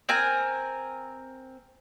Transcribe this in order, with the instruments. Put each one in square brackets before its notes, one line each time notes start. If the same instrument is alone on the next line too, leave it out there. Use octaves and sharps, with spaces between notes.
[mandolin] C4 A#4 G#5